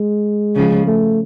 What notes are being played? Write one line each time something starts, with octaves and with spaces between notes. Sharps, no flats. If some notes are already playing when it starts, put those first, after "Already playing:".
Already playing: G#3
C#3 F3
A3